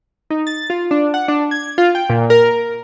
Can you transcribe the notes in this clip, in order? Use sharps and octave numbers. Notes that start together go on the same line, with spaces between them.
D#4
A6
F4
D4
F#5
D4
G#6
F4
G5
A#2
A#4